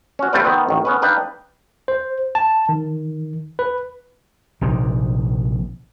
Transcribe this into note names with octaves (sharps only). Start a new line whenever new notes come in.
C#4 F#4
G3 A3 C4 F4 B4 D5
D#3 B3 C4
A1 D#3
B3 C#4 B4
D4 D#4 B4 F5 G5
C5
A5
D#3
B4
A#1 C3 D#3